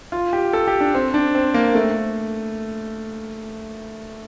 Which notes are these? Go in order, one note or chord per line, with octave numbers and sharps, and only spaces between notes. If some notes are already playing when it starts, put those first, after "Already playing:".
F4
G4
A4
G4
D4
C4
D4
C4
A#3
A3